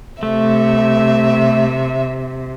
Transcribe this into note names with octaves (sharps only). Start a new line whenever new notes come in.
C3 A3 E5